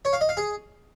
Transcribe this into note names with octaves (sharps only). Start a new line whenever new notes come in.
C#5
F5
D#5
F5
G#4